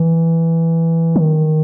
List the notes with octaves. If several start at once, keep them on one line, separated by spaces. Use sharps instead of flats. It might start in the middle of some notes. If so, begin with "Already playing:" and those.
Already playing: E3
D#3